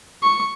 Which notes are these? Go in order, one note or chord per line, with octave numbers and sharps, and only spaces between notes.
C#6